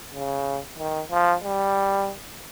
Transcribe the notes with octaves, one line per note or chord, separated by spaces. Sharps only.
C#3
D#3
F3
G3